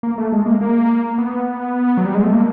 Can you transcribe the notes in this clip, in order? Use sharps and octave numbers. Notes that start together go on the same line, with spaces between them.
A#3
A3
G#3
A#3
A#3
B3
F#3
G3
G#3
A3
A#3